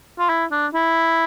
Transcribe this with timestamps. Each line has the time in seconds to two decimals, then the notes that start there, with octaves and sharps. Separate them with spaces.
0.19 F4
0.30 E4
0.52 D4
0.74 E4